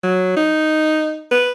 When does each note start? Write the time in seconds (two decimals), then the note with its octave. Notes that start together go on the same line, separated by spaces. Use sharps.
0.04 F#3
0.37 D#4
1.31 B4